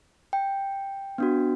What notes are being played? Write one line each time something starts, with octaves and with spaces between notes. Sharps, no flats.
G5
B3 D4 F#4